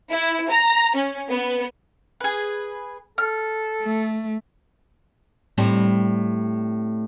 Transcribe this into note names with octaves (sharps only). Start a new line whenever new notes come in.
E4
A#5
C#4
B3
G#4 B4
A4 F6
A3
A2 G3 C4